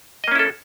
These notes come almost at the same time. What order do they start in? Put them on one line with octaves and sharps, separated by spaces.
D#5 A#3 C#4 E4 A4